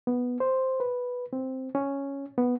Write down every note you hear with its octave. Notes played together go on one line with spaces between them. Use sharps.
B3
C5
B4
C4
C#4
B3